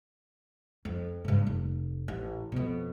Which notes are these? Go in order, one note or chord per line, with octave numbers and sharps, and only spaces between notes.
F2
G2 C#3
F1
A1
F2 B2